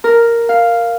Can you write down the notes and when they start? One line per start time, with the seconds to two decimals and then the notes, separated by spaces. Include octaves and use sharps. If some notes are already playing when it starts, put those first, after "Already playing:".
0.04 A#4
0.49 F5